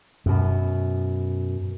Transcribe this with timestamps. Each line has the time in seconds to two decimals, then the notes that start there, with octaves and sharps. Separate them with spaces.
0.26 F#2 B2